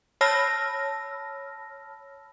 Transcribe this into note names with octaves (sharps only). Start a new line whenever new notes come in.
C#5 A5 B5 E6 F6 A#6